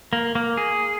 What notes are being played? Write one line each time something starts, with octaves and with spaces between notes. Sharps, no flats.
A#3
A#3
G#4